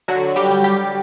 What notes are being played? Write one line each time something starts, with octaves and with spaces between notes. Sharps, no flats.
D3 F#3 F#4
G3 G4
G3
G3 G4